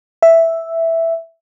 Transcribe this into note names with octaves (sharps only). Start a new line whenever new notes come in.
E5